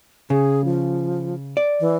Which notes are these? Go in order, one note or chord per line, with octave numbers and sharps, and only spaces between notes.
C#3 G#4
F3
D5
E3